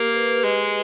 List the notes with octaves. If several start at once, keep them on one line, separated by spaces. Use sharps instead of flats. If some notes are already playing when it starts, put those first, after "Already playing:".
Already playing: A#3 G4
B4
G#3 D#5